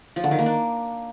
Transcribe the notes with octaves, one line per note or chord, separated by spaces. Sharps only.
F3
D3
D#3
A#3
D4